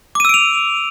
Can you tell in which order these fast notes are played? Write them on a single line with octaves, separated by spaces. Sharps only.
D6 D#7 E6 D7 F7